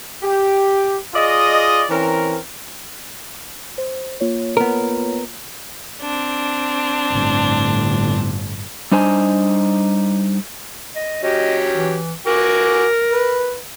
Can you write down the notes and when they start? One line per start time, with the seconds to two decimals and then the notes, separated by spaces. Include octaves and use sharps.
0.22 G4
1.13 F4 G#4 D5 D#5
1.89 E3 C4 C#4 A#4
3.78 C5
4.20 A#3 F4 C#5
4.57 B3 A#4
6.01 C4 D4
7.11 G1 A2
8.92 G3 D4 D#4 C5 G#5
10.96 D#5
11.23 F#3 C#4 G4 D#5
11.73 E3
12.27 F#4 A#4 G#5 D6
13.12 B4